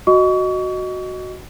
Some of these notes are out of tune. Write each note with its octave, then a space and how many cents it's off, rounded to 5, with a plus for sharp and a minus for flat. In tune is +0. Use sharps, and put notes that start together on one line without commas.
F#4 +0 D#5 +0 C#6 +35